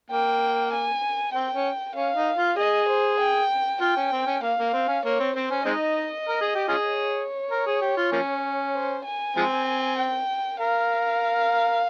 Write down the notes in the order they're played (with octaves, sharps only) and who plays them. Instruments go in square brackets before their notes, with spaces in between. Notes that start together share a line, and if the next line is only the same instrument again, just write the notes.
[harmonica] A#3 [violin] G5
[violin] G#5
[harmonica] C4 [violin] G5
[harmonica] C#4
[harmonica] C#4 [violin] F5
[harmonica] D#4
F4
[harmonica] G#4 [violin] D#5
[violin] C5
G5
[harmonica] F4 [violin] G5
[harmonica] C#4
C4
C#4
[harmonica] A#3 [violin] F5
[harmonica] A#3
C4
C#4
[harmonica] A#3 [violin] C#5
[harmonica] C4
[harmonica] C4 [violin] C5
[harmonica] C#4
[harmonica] G#3 C4 D#4 [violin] D#5
[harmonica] A#4
G#4
G4
C#4 F4 G#4
[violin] C#5
[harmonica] A#4
G#4
G4
F4
F3 A#3 C#4
[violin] C5
G#5
[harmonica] F3 G#3 C4
[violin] G5
[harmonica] A#4 [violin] F5